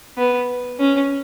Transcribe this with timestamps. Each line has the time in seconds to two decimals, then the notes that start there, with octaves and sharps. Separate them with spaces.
0.18 B3
0.80 C#4